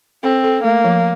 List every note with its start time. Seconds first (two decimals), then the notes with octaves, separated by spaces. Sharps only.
0.23 C4 A4
0.44 A4
0.64 A3 A#3
0.85 F3